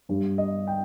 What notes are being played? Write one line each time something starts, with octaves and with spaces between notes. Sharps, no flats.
G2 G3
D#5
G5